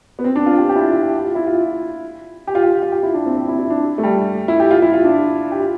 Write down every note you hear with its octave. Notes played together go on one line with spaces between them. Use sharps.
B3
C4
D4
F4
G4
G4
E4
F4
E4
G4
G4
F4
E4
F4
G4
F4
G4
F4
G4
E4
D4
C4
C4
E4
E4
D4
A3
G3
E4
G4
F4
E4
F4
D4
G4
F4